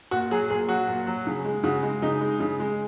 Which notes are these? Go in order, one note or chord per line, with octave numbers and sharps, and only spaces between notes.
A#2 F#4
F#3 G#4
A#2 G#4
F#3 F#4
A#2
F#3
C#3
G#3
C#3 F#4
G#3
C#3 D#4
G#3
C#3
G#3